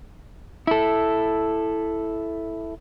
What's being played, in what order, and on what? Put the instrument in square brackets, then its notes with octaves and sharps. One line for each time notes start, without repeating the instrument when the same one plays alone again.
[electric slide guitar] E4 A4